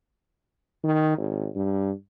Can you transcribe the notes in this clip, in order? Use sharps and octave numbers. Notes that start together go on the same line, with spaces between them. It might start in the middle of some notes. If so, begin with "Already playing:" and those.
D#3
G#1
G2